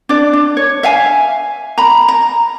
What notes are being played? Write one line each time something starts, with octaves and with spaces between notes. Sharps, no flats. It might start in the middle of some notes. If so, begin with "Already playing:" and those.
D4 D5
D4
C#5
E5 F5 G#5
A#5 B5
A#5